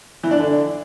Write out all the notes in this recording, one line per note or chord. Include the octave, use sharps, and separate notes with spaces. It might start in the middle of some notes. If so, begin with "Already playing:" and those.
E3
D4
D3